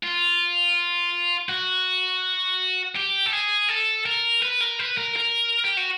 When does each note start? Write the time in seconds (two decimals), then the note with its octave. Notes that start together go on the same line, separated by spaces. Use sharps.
0.03 F4
1.49 F#4
2.95 G4
3.26 A4
3.33 G#4
3.69 A4
4.06 A#4
4.42 B4
4.60 A#4
4.79 B4
4.97 A#4
5.16 A#4
5.64 G4
5.77 F#4